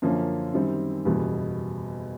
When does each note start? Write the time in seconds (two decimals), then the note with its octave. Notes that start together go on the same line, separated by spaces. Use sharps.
0.02 F#2 D3 F3 A#3 C#4
0.54 F#2 D#3 G3 C4
1.05 F#1 E2 B2 G3